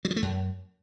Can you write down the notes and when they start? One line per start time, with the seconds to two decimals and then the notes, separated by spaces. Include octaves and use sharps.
0.05 F#3
0.11 F3
0.16 A3
0.22 F#2